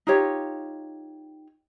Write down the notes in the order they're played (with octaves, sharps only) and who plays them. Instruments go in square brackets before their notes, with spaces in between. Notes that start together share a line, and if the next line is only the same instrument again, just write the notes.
[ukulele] D#4 F4 G4 C#5